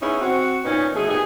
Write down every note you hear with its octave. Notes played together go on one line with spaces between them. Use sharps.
B3 C#4 D#4 E4 G#4
C4 F#4
A#2 B3 C#4 D#4
B2 F3 A3 G#4
A#2 B3 D#4 G4 G#4